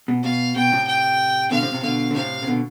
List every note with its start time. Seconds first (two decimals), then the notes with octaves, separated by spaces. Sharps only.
0.08 B2
0.24 B2 F5
0.56 B2 G5
0.72 A2 C3
0.87 G5
1.51 B2 D3 F5
1.62 A2 C3
1.72 A2 C3
1.83 B2 D3 F5
2.11 D3
2.15 A2 C3 F5
2.42 C3
2.47 B2 D3